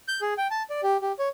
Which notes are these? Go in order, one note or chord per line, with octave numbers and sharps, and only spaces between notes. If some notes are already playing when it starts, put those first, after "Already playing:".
G6
G#4
G5
A5
D5
G4
G4
C#5